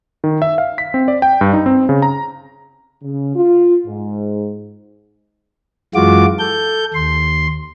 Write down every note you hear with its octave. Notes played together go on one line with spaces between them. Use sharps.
D#3
E5
F5
B6
C4
D5
G5
G2
D#4
C4
C#3
A#5
C#3
F4
G#2
F#2 E3 G#3 F4 F#4 D6
A4 G6
D#2 C6